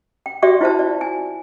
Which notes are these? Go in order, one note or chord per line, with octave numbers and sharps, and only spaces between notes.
G5
F#4 D5 E5 G5 C#6
E4 F4 C5 E5 A5
D5
G#5